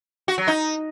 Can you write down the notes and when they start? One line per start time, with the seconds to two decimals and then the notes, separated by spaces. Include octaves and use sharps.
0.28 F#4
0.38 F#3
0.48 D#4